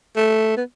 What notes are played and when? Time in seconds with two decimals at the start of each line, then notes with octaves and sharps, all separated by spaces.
0.16 A3
0.57 B3